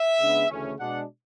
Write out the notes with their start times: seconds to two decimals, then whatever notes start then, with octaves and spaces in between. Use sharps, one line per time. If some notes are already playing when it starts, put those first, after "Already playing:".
Already playing: E5
0.20 C#3 G#3 B3 D4
0.50 D2 C#3 E3 A3 C#4
0.79 B2 G#3 D4 F#5